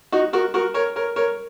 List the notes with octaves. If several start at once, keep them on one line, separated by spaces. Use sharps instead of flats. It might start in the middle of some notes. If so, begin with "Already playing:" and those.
D#4 F#4
F#4 A#4
F#4 A#4
A#4 C#5
A#4 C#5
A#4 C#5